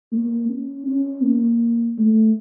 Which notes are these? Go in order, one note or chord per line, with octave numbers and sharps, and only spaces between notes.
A#3
C#4
C#4
A#3
A3